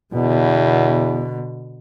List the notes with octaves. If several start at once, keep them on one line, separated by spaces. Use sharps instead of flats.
E2 B2 D3